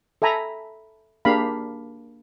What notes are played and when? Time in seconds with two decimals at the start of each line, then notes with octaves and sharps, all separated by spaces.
0.22 A4 E5 G#5 A#5 B5
1.25 A#3 D4 G4 G#4 F5 B5